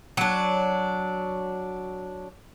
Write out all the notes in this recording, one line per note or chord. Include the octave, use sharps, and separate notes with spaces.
F#3 D4